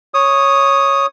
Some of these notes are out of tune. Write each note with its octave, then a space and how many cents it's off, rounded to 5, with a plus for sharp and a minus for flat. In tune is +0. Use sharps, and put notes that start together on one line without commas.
C#5 +0 D#6 +0